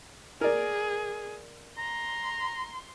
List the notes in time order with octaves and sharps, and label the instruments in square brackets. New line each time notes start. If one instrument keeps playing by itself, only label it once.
[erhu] G#4 [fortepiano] A#4 D5
[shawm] A#5 [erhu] C6